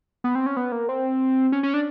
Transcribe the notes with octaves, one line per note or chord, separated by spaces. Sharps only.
B3
C4
C#4
B3
A#3
C4
C#4
C#4
D4